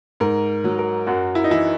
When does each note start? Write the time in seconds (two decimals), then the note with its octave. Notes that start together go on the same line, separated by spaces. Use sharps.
0.20 G#2 A#4
0.64 F#3
0.79 A#4
1.07 F#2 F#4
1.35 E4
1.44 D#4
1.50 E3 E4